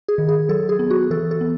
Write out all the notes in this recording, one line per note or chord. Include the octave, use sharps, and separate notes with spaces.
G#4
D#3
G#4
F#3 A4
G#4
B3
F#4
E3 A4
A4
B3